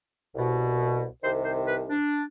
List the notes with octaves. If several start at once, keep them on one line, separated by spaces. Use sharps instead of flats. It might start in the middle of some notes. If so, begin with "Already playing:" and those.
C2 B2
C2 C3 D#3 C5
C5
B4
D4